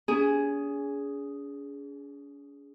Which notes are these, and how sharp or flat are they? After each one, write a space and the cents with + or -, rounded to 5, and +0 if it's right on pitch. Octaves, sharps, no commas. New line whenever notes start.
C#4 +45 G#4 +0